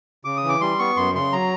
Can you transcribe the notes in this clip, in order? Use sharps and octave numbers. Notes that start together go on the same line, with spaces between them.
C#3 D6
D#6
E3
D6
G3 C6
B3 C#6
F#2 C6
C#3 C6
F#3 A#5